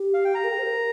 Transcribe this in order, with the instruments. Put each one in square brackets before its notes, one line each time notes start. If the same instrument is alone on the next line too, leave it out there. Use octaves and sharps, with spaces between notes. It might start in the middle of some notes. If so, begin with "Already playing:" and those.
Already playing: [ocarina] G4
[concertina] F5
G5
A#5
[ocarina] A#4
G4
C5
A#4